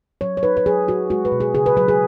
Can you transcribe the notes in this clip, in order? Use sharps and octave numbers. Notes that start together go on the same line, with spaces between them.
F#3 C#5
C#5
D#4 B4
B4
F#3 G#4
F#3 F#4
G#3 F#4
B4
B2
G#4
C#3 G#4
B4
F#3 B4
G#4